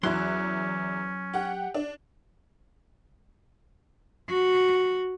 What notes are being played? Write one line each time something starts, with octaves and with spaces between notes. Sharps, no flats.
E2 F#3 C#4 E4 C6 F#6
G4 F#5
D4
F#4